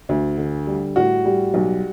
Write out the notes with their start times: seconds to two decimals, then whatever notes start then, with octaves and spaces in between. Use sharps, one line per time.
0.09 D2
0.38 D3
0.67 G3
0.96 A2 F#4
1.25 G3
1.54 B1